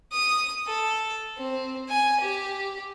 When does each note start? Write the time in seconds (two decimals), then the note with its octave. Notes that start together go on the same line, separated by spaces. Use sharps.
0.12 D#6
0.67 A4
1.38 C4
1.89 G#5
2.21 G4